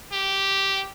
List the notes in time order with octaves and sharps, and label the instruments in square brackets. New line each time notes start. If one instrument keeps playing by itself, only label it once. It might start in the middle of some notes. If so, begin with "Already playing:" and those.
[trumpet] G4